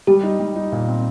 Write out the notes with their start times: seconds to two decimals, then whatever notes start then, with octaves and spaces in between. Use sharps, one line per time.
0.07 G3 G4
0.23 D#4
0.40 G3
0.56 D#4
0.72 A#2
0.89 C4